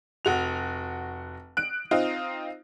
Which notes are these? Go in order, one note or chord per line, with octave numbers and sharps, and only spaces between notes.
F1 F#4 F7
F#6 D7
C4 D#4 F4